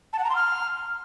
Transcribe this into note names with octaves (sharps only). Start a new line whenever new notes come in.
A5
F#5
A#5
C6
F6